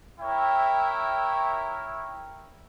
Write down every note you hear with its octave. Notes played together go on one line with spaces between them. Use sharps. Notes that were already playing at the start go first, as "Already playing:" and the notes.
E4 A#4 C#5 E5 G5